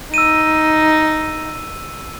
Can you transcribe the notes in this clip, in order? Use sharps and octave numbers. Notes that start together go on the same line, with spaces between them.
D#4 E6 D#7